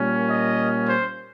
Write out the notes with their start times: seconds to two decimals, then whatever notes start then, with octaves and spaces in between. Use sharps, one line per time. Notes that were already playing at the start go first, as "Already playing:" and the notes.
Already playing: A#2 G3 A#3 C#4
0.28 D#5
0.86 C5